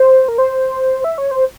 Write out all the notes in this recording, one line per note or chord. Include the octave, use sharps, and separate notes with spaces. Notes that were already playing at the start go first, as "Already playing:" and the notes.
Already playing: C5
A#4
C5
E5
C#5
C5